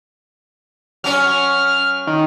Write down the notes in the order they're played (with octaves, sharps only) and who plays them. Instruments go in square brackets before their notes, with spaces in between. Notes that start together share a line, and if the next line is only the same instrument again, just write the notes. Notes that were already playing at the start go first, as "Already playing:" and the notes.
[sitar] F#3 C#4 C#5 [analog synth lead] F6
[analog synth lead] D#3